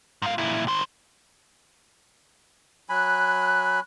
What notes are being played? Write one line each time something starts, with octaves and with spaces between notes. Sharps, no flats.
G#2 F5
A#2 E4
D#3 C5
F#3 G#5 B5 F#6